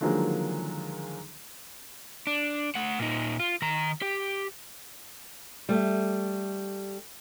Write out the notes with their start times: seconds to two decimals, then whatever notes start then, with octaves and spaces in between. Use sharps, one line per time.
0.01 D3 D#3 F3 F#3 G#3 A#3
2.27 D4
2.75 A3 F#5
2.99 A#2 D#4
3.40 F4
3.62 D#3 A#5
4.02 G4
5.69 G3 A3